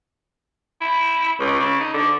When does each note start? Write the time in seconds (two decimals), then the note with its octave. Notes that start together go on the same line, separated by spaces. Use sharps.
0.81 E4
1.40 C#2
1.60 C#3
1.80 D#4
1.94 D3